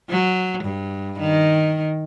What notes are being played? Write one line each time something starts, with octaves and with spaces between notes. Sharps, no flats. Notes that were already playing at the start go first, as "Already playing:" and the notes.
F#3
G2
D#3